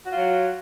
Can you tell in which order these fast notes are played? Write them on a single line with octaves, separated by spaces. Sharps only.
F#4 F4 F#3